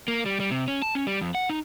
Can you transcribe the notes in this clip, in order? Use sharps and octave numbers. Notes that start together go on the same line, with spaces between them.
A#3
G3
G3
C3
C#4
A5
C#4
G3
F2
F#5
D#4